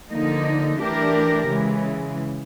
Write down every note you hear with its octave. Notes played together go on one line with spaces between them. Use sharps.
D3 F3 A#3 D#4
E3 A3 D4 G4 A#4
C#3 E3 G#3